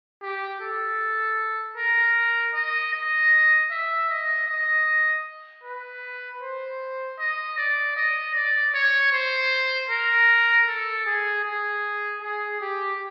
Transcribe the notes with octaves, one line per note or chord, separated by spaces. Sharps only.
G4
A4
A#4
D#5
D#5
E5
D#5
D#5
B4
C5
D#5
D5
D#5
D5
C#5
C5
A#4
A4
G#4
G#4
G#4
G4